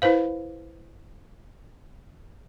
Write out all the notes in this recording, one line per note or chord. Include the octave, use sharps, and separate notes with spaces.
E4 B4 C5 F5